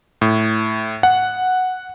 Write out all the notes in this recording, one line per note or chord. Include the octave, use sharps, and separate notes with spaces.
A2
F#5